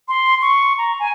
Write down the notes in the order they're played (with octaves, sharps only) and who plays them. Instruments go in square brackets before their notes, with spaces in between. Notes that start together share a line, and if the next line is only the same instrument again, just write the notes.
[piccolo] C6
C#6
A#5
G#5